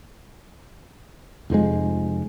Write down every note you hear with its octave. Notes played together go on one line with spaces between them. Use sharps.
F1 F2 F3 G#3